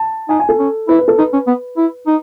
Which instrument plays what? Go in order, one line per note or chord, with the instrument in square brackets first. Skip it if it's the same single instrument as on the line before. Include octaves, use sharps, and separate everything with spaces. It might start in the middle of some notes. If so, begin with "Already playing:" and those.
Already playing: [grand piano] A5
[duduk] D#4 [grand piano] G#5
[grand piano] G#5
A4
[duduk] C#4
[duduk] E4 [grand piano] B4
[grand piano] B4
A4
[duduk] D#4 [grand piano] B4
[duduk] C#4
B3
E4
D#4